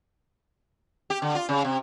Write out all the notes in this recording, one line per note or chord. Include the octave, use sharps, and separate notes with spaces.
G4
D3
F4
C#3
C3